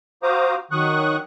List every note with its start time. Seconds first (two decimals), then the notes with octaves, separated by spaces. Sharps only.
0.23 F#4 C5 F5 A#5 D6 D#6
0.71 D#3 F#3 C#6 D#6 F#6